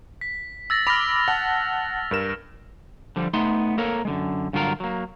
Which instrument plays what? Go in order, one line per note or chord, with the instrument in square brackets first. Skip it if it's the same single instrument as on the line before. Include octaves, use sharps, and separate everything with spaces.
[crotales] B6
E6 A6 A#6
[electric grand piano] B5 D6 [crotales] F6 A#6 F7
[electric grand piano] F#5 A5
G2 A#4 E7
[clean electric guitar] D3 F3 G3
A3 B3 D#4 C6
A#3 A4 A#4 C#5
F#2 D3 G#3
G2 D3 F#3 F4 F#4 A#4
F#3 A#3